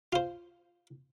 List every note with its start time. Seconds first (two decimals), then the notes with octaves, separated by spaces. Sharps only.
0.13 F4 C5